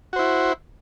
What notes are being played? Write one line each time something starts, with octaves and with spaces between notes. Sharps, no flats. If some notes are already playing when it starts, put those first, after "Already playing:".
E4 F#4 C5